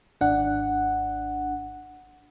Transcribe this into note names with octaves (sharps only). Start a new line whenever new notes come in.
G#1 D4 F#5